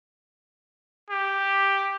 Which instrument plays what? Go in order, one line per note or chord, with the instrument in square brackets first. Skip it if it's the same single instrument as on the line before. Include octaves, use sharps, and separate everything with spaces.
[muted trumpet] G4